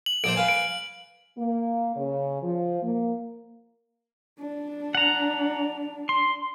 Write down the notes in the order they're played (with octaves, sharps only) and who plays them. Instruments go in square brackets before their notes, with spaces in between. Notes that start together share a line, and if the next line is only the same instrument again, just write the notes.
[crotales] F#7
[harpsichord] A#1 D4 C5 [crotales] D7
[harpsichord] B4 F5 G#5
[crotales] D7
[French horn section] A#3
C#3
F3
A#3
[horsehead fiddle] D4
[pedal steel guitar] F#5 A#5
C6